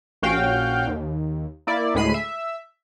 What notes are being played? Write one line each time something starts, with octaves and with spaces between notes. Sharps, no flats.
A#1 C#4 F#4 F5 G5
D#2
A#3 E4 D5
D2 A2 G#3 B5 C7 D#7
E5